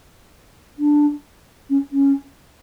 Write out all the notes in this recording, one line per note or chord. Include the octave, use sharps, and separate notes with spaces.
D4
C#4
C#4